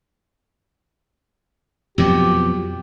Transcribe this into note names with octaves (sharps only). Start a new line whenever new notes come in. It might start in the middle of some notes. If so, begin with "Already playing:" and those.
F2 B2 F#3 G4